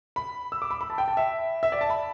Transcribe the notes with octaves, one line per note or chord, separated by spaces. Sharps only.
B5
E6
D6
B5
B5
A5
G5
A5
E5
E5
D5
A5
B5